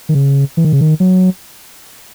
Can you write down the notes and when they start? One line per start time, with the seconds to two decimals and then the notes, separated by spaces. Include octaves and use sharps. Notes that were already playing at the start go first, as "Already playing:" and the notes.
0.09 D#3
0.15 C#3
0.57 E3
0.65 D#3
0.73 C#3
0.81 D#3
1.00 F#3